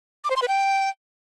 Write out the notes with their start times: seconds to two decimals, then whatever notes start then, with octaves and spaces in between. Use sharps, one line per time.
0.24 D6
0.30 C5
0.36 C6
0.42 B4
0.48 G5